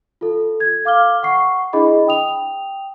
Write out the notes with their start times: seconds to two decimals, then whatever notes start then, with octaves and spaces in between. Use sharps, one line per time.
0.21 F4 A4
0.60 G#6
0.84 A4 F5 D6 F6 G7
1.23 F#5 C#6 C7
1.73 D4 E4 G#4 D#5 B5
2.07 G5 D#6 F7